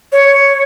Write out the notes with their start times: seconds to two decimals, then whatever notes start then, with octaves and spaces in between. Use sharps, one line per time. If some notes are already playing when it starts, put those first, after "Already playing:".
0.12 C#5